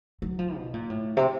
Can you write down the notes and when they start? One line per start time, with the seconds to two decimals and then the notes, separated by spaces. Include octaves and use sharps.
0.22 F#3
0.39 F3
0.56 B2
0.74 A#2
0.90 A2
1.17 C3